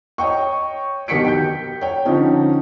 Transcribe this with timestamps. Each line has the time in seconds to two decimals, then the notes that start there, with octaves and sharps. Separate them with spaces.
0.18 C#5 D#5 G5 C#6
1.08 B2 D#3 G4 B6 C#7 D7
1.25 G5 G6
1.81 C#5 G5
2.05 D3 F3 C#4 D#4